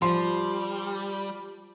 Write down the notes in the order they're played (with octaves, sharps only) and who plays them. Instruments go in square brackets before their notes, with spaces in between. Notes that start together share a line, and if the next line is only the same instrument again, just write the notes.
[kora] F3 [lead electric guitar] G3 [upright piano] C6